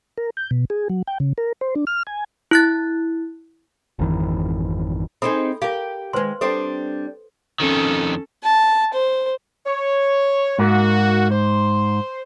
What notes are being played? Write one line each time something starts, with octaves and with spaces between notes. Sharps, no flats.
A#4
G6
B2
G#4
F#3
G5
C#3
A#4
C5
D4
F6
G#5
E4 F#6 A6
G#1 F2 D#3 E3
C4 D#4 G#4 A4 B5
G4 A#4 F5
D#3 G#3 B4 C5 C6
G3 C4 D4 A4
F2 D#3 C#4 A4
A5
C5
C#5
G#2 A#3 F#4
C5